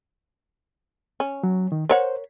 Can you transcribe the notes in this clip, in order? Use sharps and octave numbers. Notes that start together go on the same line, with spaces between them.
C#4
F#3
D#3
A#4 C5 C#5 F#5